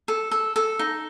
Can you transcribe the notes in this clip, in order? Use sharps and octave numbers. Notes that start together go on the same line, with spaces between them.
A4
A4
A4
D#4